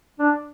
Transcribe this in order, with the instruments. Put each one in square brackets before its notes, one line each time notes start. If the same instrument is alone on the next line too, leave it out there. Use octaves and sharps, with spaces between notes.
[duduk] D4